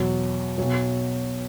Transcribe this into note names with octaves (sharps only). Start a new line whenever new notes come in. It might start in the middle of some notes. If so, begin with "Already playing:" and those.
Already playing: E2 B2 F#3
B1 B2 F#3